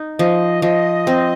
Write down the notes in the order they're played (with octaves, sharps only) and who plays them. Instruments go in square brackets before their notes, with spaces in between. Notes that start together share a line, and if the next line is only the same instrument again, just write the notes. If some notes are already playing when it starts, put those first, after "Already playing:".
Already playing: [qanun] D#4
[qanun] F3 [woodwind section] D#5
[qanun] F3 [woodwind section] D#5
[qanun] C4